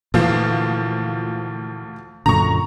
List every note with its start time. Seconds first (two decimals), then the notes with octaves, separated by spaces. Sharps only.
0.14 D2 A#2 E3 F3 F5
2.26 F#2 A#2 D3 A#5 C#6